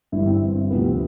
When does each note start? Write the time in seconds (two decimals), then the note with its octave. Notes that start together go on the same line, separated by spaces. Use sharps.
0.12 G1 G2 E3 G3 E4
0.27 C4
0.42 C4
0.70 D2 C3 F3 B3
0.85 C4